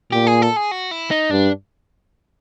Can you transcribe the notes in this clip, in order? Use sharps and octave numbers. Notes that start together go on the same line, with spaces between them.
A#2 G4
G#4
A4
G#4
F#4
E4
D#4
G2 D4